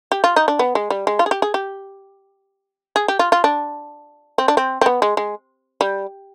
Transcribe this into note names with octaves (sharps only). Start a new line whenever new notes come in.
G4
F4
D#4
D4
B3
G#3
G3
G#3
F4
G#4
G4
G#4
G4
G#4
G4
F4
F4
D4
C4
D4
C4
C4
B3
G#3
G#3
G3